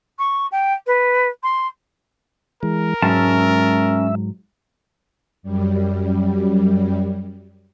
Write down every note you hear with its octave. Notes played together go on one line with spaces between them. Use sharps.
C#6
G5
B4
C6
E3 G#3 A#4
G#2 F#3 G#3 C#4 E5 A5
F#2 G3